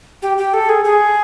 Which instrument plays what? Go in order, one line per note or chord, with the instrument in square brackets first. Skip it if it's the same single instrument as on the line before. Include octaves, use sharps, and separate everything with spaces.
[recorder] G4
G4
A4
G#4
G#4